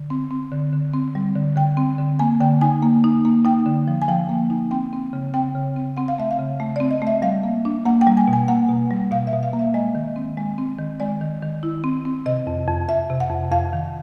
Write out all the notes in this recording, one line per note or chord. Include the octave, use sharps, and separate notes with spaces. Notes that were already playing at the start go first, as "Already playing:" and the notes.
Already playing: D3
C4
C4
D3
D3
C4
G3
D3
D3 G5
C4
D3
A#3 G#5
D3 G5
D#4 G#5
A#3
D#4
A#3
D#4 G5
D3
F3
G#5
F3 G5
A#3
D#4
C4 G5
C4
C#3
C4 G5
C#3
C4
C4 F#5
F5
A3 E5
F5
C#3
A3
C4 D5
D#5
A3
E5
G3 F5
A#3
D4
A#3 F#5
G5
G3
G#5
B2
G#5
A#3 F#5
B2
G3
B2 F5
E5
B2
F5
A#3
E5
G#3 D#5
D#3
C4
G#3
C4
D#3
G#3 D5
D#3
D#3
E4
C4
C4
C3 D#5
F2
F2
F2 E5
C3
F#5
F2
F2 F5
D#3